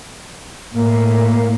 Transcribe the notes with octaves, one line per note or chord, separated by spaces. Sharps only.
A2 A#3